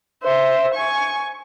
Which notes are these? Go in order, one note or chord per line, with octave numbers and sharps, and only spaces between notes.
C5 E5
G#5 C#6